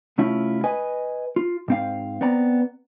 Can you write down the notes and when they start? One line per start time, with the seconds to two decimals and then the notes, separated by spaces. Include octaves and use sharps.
0.18 C2 A3 C#4 E4 F4
0.64 B4 D#5 G#5
1.36 F4
1.68 G#2 C4 F5
2.21 B3 C4 D5 A#5